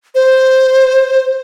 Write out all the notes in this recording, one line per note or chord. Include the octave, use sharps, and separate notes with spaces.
C5